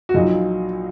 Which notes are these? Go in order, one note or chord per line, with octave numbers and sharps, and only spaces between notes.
F#4
A#1 A#2 F#3 D#4